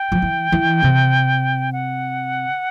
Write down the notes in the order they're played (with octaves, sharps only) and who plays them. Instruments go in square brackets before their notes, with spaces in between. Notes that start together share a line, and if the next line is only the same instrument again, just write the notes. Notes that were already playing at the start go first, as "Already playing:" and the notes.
Already playing: [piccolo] G5
[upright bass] F3
E3
E3
C3
[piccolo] F#5